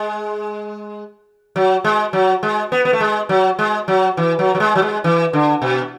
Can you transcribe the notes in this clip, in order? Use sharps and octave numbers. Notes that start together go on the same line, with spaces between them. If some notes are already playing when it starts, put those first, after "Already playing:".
Already playing: G#3
F#3
G#3
F#3
G#3
B3
B3
A3
G#3
F#3
G#3
F#3
E3
F#3
F#3
G#3
F#3
G#3
E3
D3
B2